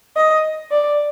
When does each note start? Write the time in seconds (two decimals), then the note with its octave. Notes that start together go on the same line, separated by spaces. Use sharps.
0.17 D#5
0.71 D5